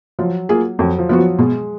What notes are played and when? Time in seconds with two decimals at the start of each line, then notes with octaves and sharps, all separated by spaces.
0.19 F3 F#3
0.49 A#3 F4 G#4
0.79 F2 F#3
0.98 F3
1.09 F3 B3 F#4
1.18 F#3
1.39 B2 G#3